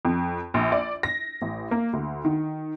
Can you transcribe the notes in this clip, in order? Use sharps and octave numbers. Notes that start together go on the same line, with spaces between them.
F2
A#1
D5
A#6
A1
A#3
D2
D#3